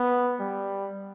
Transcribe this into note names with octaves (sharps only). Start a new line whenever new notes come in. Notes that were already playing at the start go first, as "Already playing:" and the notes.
Already playing: B3
G3